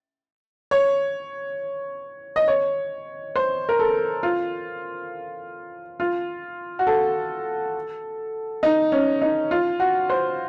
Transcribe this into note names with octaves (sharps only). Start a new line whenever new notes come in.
C#5
D#5
C#5
C5
A#4
A4
F4
F4
F#4
A4
D#4
C#4
D#4
F4
F#4
C5